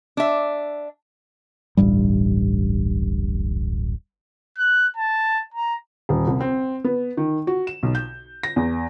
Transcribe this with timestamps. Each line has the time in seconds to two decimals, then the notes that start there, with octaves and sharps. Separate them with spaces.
0.17 D4 E5
1.77 D1 A1 G2 G3
4.58 F#6
4.97 A5
5.54 A#5
6.09 D#1
6.27 C2
6.40 C4
6.85 B3
7.17 D#3
7.47 F#4
7.67 E7
7.83 B1
7.95 G6
8.43 A#6
8.56 E2